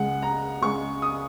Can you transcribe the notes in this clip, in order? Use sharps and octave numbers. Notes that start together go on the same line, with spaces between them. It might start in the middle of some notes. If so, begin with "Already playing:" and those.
Already playing: C#2 C#3 G#3 F#5
A#5
C#2 C#3 G#3 C#6
D#6